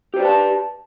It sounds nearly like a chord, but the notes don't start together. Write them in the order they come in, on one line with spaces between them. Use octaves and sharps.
G4 C5 D5 B4 A5